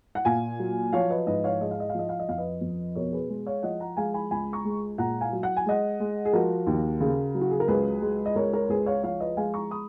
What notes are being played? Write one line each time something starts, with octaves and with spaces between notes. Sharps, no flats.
F#5
A#2 F5 G#5
F#3
F3 C#5 F5
B4 D#5
G#2 B4 D#5
C#5 F5
G#3 D#5
F5
D#5
F5
F3 D#5
F5
D#5
F2 F5
B4 D#5
F2
B2 A#4 C#5
G#4 B4
G#3
C#5 F5
F3 D#5 F#5
F#5 A#5
G#3 F5 G#5
G#5 B5
C#2 G#5 B5
A#5 C#6
G#3
A#2 F#5 A#5
F5 G#5
F#3
F#5
G#5
G#3 D#5 F#5
G#3
G#4
F3 F#4 A#4
D#2
C#3
F#3
F#4
G#4
A#4
C#2 G#4 B4
G#3
D#5
C#2 A#4 C#5
A#4 C#5
C#2 G#4 B4
C#5 F5
F3 C#5 F5
B4 D#5
G#3 F5 G#5
A#5 C#6
B5 D#6